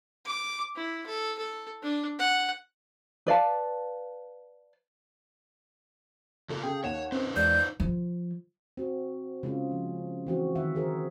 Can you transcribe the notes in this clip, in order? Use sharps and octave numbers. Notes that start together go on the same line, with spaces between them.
D6
E4
A4
A4
D4
F#5
B4 D5 F5 A5
C#3 F4 A4 A#4
C#3 G#4 A4 G5
D#2 C#5 F#5 E7
F#2 C4 D#4 B4 C5
E2 G#3 D5 G6
F3
C4 F#4
C#3 G#3 C4 C#4 F4 G#4
F3
E3 C4 F#4
D#3 E5 F#5
F#4 G#4 A#4 C5